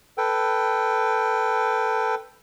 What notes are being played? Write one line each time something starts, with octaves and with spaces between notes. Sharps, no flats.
A4 B4 G5